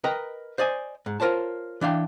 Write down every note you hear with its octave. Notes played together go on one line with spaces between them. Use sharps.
A#4 B4 D#5 G5 A#5
C5 D5 D#5 G#5
G#2
F4 A#4 C5 C#5 A5
E3 D4 F5 G5